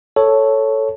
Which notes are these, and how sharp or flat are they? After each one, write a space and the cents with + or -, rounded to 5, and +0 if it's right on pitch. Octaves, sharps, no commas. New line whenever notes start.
A4 +0 C#5 +0